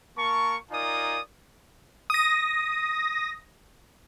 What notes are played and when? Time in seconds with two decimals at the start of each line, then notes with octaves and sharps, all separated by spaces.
0.17 A#3 A#4 A5 C#6
0.71 D#4 F4 A#4 D5 G#5 D#6
2.10 D#6 A#6